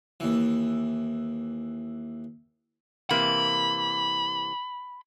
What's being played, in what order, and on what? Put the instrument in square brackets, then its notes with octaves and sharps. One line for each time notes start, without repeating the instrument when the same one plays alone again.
[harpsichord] D#2 E3
[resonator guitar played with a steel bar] C3 E3 A#3 [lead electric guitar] B5